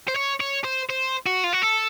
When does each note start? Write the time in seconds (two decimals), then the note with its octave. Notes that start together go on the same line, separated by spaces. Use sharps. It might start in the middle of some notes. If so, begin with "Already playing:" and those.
0.08 C5
0.16 C#5
0.40 C#5
0.64 C5
0.90 C5
1.26 F#4
1.44 F4
1.53 F#4
1.63 A4